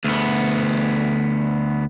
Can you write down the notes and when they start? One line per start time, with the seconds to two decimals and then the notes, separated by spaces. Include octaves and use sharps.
0.04 D2 B3